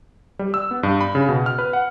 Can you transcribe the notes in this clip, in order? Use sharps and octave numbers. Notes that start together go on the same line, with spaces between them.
G3
E6
B3
G2
B5
C#3
B2
F6
B4
F#5